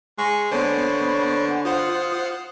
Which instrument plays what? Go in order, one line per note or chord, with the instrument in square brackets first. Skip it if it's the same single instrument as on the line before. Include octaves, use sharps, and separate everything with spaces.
[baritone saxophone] G#3 [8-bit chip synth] C#6
[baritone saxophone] D3 [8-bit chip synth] B3 C5 [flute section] C#5 B5 C#6
[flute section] F#5 G#5 B5
[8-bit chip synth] F4 C5 F#5 [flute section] D#6